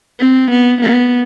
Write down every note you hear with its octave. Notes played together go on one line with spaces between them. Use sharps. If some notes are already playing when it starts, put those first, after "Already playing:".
C4
B3
B3